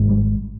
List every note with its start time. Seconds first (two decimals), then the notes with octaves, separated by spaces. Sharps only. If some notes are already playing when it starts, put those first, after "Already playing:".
Already playing: G#1 G#2
0.09 G3